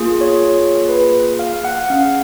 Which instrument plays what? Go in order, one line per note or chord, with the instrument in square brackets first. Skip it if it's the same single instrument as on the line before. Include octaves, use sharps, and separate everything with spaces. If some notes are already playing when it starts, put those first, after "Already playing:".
Already playing: [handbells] A#3 F4 G#4
C#5
B4
F5
F#5
C#4 G#4 F5